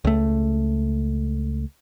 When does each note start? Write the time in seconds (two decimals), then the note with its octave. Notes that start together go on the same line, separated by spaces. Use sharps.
0.05 C#2 A3